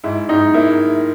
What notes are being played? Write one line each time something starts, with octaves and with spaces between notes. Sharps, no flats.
G#2 E4
G#2 D#4
A#3 E4